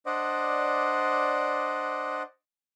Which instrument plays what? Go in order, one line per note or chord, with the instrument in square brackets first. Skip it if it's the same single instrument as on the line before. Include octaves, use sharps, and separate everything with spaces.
[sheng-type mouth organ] D4 C5 D5 D#5 F#5